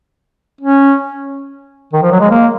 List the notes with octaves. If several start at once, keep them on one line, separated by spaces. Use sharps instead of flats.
C#4
D#3
F3
F#3
G#3
A#3